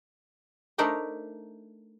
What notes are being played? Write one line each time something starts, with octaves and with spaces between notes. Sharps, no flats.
A3 D4 D#4 A#4 C5